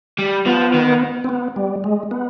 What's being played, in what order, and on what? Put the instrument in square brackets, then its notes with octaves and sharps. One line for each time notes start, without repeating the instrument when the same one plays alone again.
[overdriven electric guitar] G3
[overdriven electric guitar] F3 [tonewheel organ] B3
[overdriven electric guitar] D#3
[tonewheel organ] C4
B3
G3
G#3
B3